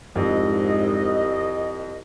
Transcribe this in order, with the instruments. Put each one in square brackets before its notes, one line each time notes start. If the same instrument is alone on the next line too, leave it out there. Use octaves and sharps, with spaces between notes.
[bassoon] C2 [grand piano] F2 [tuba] G#2 [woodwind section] D#5